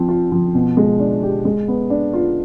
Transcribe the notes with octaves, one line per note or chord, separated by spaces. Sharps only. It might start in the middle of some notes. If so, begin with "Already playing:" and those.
Already playing: F3 C4
F4
F3
B2
G#3
D4
G4
G#3
B3
D4
F4